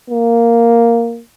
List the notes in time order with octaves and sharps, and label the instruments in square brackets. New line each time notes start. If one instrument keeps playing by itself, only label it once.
[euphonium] A#3